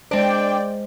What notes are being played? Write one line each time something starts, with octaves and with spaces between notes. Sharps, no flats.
G#3 C4 D4 C5 D5 G5